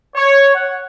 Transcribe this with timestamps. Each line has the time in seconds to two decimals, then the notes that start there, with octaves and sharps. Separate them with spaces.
0.16 C#5
0.55 F#5